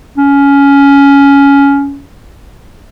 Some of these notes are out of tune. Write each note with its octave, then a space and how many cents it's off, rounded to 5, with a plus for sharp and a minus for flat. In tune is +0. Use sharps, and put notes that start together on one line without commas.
C#4 +15